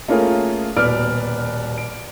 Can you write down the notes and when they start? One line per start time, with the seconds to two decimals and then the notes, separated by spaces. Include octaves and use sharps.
0.08 A3 A#3 C#4 F4 G#4 A#4
0.76 D#1 B2 B4 D5 F6 D7
1.78 D7